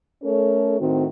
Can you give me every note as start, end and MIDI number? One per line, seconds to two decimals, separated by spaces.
0.22 0.76 57
0.22 0.76 61
0.22 0.76 69
0.22 0.76 70
0.22 0.76 73
0.80 1.05 45
0.80 1.05 51
0.80 1.05 60
0.80 1.05 66